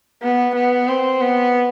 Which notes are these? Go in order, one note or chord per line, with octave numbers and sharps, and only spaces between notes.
B3
B3
C4
B3